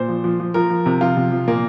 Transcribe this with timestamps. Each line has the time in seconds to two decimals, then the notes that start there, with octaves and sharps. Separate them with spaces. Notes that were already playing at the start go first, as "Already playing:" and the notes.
Already playing: A#2 C5
0.08 F3
0.24 F3
0.40 F3
0.54 F3 A#4
0.70 F3
0.86 C3
1.01 F3 F4
1.17 C3
1.32 F3
1.47 A#2 A#3